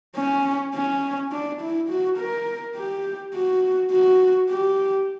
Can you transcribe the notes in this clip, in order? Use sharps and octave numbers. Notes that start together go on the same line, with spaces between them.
C#4
C#4
D4
E4
F#4
A#4
G4
F#4
F#4
G4